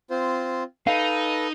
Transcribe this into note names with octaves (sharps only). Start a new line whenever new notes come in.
C4 F4 C5
D#4 A4 B4 F5